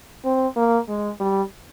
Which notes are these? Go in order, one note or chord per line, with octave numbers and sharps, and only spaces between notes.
C4
A#3
G#3
G3